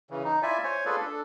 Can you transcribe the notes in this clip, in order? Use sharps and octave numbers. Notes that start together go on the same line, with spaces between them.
C#3 E3
D#4
E4 F4 D5 E5 G#5
C5 C#5 G#5
F4 G#4 A4 B4 D5
D4 A4